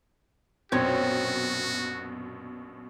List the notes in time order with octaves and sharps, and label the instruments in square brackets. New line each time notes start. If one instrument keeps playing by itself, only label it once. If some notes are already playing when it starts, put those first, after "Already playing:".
[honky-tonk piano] A#1 F#2 B2 [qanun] C4 C#5 [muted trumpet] F#4